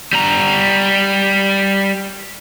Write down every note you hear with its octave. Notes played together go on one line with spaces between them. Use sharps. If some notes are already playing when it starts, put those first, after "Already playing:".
G3 A#5